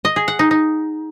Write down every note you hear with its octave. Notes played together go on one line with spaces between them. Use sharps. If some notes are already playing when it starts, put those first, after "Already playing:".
D#5
G#4
F#5
D#4
D#4